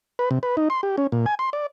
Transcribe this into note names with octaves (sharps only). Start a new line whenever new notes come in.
B4
C3
B4
D#4
C6
G4
C#4
A#2
G#5
C6
D5